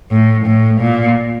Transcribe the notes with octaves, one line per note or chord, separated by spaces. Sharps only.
A2
A2
A#2